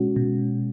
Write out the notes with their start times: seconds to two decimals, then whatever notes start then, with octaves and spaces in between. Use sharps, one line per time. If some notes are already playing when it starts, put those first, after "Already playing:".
Already playing: B2 G#3 C#4 F#4
0.16 B2